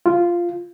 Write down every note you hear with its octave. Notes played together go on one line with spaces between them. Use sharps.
F4